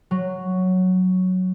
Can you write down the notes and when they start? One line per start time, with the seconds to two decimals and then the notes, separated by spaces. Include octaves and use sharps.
0.11 F#3